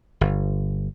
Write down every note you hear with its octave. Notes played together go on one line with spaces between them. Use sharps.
G1